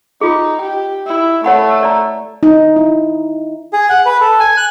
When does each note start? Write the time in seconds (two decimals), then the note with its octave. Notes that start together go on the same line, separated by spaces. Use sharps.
0.21 D#4 F4 G#4
0.61 G4
1.07 E4
1.44 A3 C#5 F#5 B5
1.80 C#5 D5 A#5
2.43 D#4
2.76 E4
3.73 G#4
3.90 F#5
4.06 B4
4.21 A4
4.39 G#5
4.57 F#6